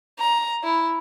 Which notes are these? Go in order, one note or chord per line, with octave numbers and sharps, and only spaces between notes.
A#5
E4